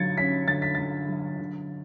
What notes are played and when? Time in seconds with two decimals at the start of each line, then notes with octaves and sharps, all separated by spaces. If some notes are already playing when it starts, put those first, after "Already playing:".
Already playing: D3 F#3 G#6 A6 C#7
0.17 C#4 B6
0.48 D3 A6
0.62 B6
0.75 D3 A6
1.09 F#3
1.40 D3